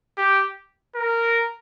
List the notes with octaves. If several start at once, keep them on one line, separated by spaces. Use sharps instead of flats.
G4
A#4